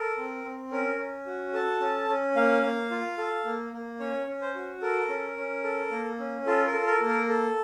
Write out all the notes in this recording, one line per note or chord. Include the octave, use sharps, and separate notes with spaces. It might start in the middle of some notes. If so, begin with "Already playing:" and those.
Already playing: A4 A#4
C4
C4
C#4 A#4
C#4
F#4
A4 A5
C#4
C#4
A#3 F5
A#3
F4
A4
A#3
A#3
C#4 C#5
C#4
C5
F#4
A4 A#4
C#4
C#4
A4
A#3
C#4
F4 A4
A#4
A4
A#4
A#3
A#4
A4